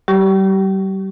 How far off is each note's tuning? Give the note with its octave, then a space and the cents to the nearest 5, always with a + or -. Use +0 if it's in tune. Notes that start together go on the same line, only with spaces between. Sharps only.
G3 -35 G4 -30 C#6 +15